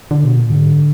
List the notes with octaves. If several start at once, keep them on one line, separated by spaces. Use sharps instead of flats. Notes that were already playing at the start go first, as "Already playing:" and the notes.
D3
B2
A#2
G#2 D3